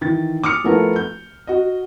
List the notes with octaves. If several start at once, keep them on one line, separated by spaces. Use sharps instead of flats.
D#3 E3 A6
D6 D#6 F6 C#7
F3 A3 B3 E4 A#4
G6
F#4 D#5